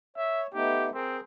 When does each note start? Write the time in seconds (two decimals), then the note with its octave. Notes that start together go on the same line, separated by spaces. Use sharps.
0.16 C#5 E5
0.54 A3 B3 D#4 G4
0.94 C4 G#4 A#4